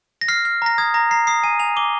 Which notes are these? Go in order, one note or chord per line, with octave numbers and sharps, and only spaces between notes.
A#6
F6 C7
F6
A#5 A#6
D#6 G#6
A#5 A#6
A#5 C7
D#6 C7
G#5 D#7
G#5 F7
D6 G7